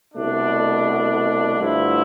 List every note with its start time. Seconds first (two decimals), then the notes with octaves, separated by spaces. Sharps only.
0.13 C2 B2 A3 D4
1.60 G2 D3 F3 A3 E4